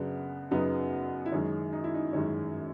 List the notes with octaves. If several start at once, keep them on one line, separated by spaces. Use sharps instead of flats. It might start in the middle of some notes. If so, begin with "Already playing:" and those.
Already playing: F#2 C#3 F#3 B3 D4
F#2 C#3 F#3 B3 D#4
E4
F#2 D#3 G#3 C#4 D#4
D#4
E4
D#4
F#2 D#3 G#3 C#4